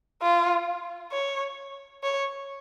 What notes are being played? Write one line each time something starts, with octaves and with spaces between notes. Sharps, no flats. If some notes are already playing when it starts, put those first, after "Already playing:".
F4
C#5
C#5